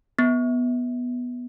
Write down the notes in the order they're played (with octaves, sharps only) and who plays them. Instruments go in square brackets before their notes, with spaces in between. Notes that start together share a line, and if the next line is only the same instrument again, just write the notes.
[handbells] B3